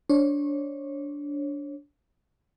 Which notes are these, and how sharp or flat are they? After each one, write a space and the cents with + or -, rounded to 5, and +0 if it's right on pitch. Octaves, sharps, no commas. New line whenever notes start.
D4 -20 C#5 -30